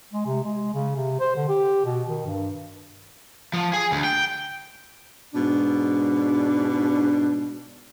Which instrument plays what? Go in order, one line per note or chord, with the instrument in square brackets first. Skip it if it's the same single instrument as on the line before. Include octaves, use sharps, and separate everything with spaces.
[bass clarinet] G#3
C3
G#3
C#3
C3
C5
D3
G4
B2
D#3
G2
[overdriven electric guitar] F3
G#4
D2
G5
[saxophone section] G#2 B2 D4